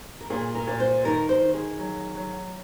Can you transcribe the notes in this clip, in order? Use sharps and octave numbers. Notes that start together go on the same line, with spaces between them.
A#4
A#2 G#4
A#4
A#2
C5
D#3 A#4
C5
D#3
G#4
F#3
F#3